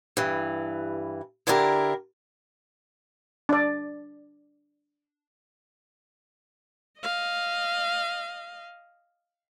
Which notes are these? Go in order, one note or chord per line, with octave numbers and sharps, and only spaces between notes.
G2 E3
D3 D4 E4 G4 G#4 A#4
D4 D5
D#5 F5